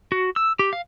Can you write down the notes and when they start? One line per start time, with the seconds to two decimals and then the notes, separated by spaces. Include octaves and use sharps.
0.12 F#4
0.36 E6
0.59 G4
0.73 F5